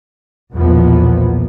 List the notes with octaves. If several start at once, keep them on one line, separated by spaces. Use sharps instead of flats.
B1 E2 A#2 F3 A#3 B3